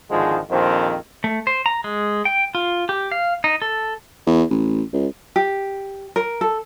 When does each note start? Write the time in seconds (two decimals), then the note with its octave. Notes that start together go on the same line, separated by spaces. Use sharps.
0.10 G#1 D3 D#3 F3 G#3
0.50 A#1 F2 D#3 C4
1.24 A3
1.47 C5
1.66 A#5
1.84 G#3
2.25 G5
2.55 F4
2.89 G4
3.12 F5
3.44 D#4
3.62 A4
4.26 E2
4.50 A1
4.93 C#2
5.36 G4
6.16 A#4
6.41 A4